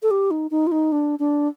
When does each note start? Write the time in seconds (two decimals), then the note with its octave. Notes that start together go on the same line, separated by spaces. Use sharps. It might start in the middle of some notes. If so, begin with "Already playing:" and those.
0.02 A4
0.11 G4
0.31 D#4
0.51 D#4
0.67 F4
0.72 D#4
0.92 D4
1.19 D4